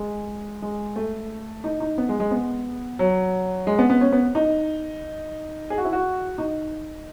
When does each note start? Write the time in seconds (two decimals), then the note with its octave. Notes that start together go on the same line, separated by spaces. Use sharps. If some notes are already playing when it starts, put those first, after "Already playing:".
Already playing: G#3
0.62 G#3
0.96 A3
1.64 D#4
1.80 D#4
1.98 B3
2.09 G#3
2.20 G#3
2.31 B3
2.99 F#3
3.67 G#3
3.79 B3
3.90 B3
4.01 C#4
4.12 B3
4.35 D#4
5.70 G#4
5.78 F#4
5.85 E4
5.93 F#4
6.38 D#4